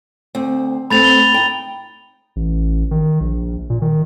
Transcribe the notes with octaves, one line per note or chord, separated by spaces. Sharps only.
D2 C4
A3 B3 C4 B5 A6 F7
G7
D#4 G5
A1
D#3
A#1
A#2
D#3